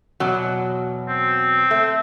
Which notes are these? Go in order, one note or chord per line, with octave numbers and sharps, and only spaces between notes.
E2 B2 F#3
C4
A3